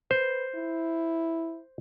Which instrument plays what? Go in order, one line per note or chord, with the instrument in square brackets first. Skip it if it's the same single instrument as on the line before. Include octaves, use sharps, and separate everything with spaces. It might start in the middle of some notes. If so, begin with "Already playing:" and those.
[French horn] B4 [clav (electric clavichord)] C5
[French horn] E4